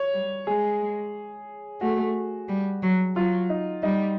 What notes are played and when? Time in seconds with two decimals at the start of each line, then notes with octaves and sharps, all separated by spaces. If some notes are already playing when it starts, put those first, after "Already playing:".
Already playing: C#5
0.13 G3
0.47 G#3 G#4
1.81 A3 F#4
2.49 G3
2.82 F#3
3.16 F#3 F4
3.50 D#4
3.83 G3 D#4